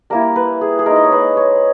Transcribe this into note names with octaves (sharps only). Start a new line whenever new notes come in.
G3 A#3 E4 A#4
B4
G#4
G#4
G#3 D#4 A#4
D#5
C#5
B4
C#5